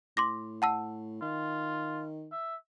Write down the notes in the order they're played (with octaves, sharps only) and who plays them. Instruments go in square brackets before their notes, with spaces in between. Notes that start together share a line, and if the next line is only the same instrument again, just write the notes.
[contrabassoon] A2 [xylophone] C6 D6 A#6
[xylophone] F#5 A5 E6
[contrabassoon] D#3 [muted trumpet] F4
[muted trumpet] E5